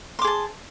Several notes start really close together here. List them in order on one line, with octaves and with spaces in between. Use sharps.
C6 D6 G#4 A5